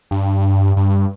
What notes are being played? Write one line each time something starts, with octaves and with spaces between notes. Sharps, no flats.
G2
G2